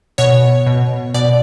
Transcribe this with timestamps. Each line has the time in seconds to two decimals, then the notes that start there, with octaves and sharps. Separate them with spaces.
0.18 B2 C#5
0.66 B2
1.14 B2 D5